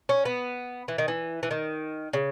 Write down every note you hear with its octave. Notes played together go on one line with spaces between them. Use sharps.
C#4
B3
E3
D#3
E3
E3
D#3
C#3